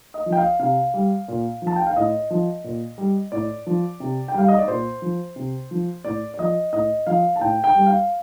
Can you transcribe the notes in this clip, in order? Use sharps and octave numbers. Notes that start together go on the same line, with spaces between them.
D#5
F3
G5
F5
C3 F5
G3
A#2
F3
A5
G5
F5
A2 D#5
F3
A#2
G3
A2 D5
F3
C3
G5
G3 F5
D#5
D5
A#2 C5
F3
C3
F3
A2 D5
D5
F3 D#5
A2 D#5
F3 F5
A5
A2 G5
G5
G3
F5